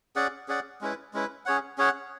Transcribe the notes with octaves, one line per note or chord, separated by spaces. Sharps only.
C#4 G#4 D5 F#5
C#4 G#4 D5 F#5
G#3 C#4 E4 B4
G#3 C#4 E4 B4
C#4 G#4 C#5 F#5
C#4 G#4 C#5 F#5